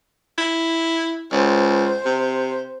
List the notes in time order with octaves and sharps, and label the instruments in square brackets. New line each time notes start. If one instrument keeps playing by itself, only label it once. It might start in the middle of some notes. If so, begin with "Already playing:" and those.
[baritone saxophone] E4
[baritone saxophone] C#2 [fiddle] C5
[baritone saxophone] C3